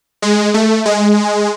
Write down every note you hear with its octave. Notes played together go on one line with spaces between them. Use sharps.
G#3
A3
G#3